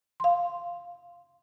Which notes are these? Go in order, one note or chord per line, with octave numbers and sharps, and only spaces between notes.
F5 C6